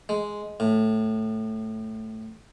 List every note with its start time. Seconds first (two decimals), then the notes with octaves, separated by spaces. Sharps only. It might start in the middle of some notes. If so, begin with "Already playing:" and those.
0.09 G#3
0.60 A2